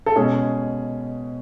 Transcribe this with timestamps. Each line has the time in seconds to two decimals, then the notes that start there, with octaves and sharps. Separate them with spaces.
0.06 A4
0.16 B2 G#3 C#4 G#4